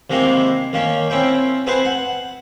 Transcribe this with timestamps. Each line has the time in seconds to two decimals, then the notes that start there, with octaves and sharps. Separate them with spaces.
0.10 C3 D#3 G#3 A#3 D#4 E4
0.73 D#3 A#3 C#4
1.10 C4 C#4 E4 G5
1.67 B3 C4 E4 G#4 B4 C5
1.85 F#5